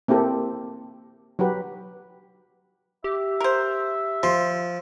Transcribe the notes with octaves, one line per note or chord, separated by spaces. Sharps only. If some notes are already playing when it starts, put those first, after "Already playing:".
A#3 C4 E4 G4 A4
F#3 F#4 G4 B4
G4 E5
A#4 C5
F3 C6